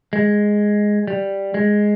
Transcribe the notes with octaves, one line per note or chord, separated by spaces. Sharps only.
G#3
G3
G#3